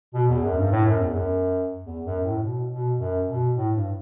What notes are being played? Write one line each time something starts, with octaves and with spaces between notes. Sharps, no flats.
B2
E2
F#2
G2
A2
F#2
E2
F#2
E2
F#2
A2
B2
B2
F#2
B2
A2
G2